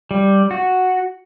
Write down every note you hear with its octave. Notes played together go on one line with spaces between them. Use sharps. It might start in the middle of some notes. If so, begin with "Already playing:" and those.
G3
F#4